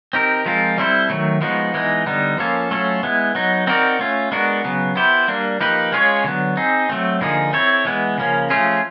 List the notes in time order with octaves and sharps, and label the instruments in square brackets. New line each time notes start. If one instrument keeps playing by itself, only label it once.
[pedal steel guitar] C4 D#4 G4 A#4
F3 G#3 C4 F4 A#4
G3 C4 E4 A4 C5
D#3 F#3 A3
F3 G#3 B3 D#4 F#4
E3 G#3 B3 D#4
D3 G3 B3 D#4
F3 A#3 C#4 F4 A4
F#3 A3 C#4 F4 A4
G#3 B3 E4
F#3 B3 D#4
C4 D#4 F#4 A#4 D5
A3 C#4 F4
G#3 B3 D4 F#4 A#4
C#3 F#3 B3
B3 E4 G4 C5
G3 A#3 D4
F3 A#3 D#4 G4 B4
G#3 C#4 F4 G#4 C#5
D3 F#3 B3
C4 D#4 G#4
F#3 A3 C4
D3 F3 A#3 D#4 G#4
C4 E4 A4 C#5
E3 G#3 B3
C#3 F3 A#3 C#4
F3 A3 C#4 F4 G#4